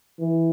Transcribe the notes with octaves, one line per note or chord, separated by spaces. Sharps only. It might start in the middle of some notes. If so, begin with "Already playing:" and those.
E3